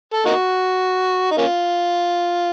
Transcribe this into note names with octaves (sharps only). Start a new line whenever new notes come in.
A4
A#3 D#4 F#4
D#4
A#3 C#4 F4